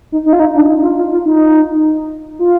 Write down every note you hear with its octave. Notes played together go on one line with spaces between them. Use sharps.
D#4
D#4
F4
D#4
D4
D#4
F4
F4
F4
D#4
F4